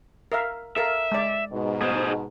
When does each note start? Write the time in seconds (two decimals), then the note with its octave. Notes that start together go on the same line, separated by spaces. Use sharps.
0.32 A#4 E5 F5
0.76 A4 A#4 E5 F5
1.12 G#3 D5
1.52 G#2 B2
1.82 B3 G#4 C5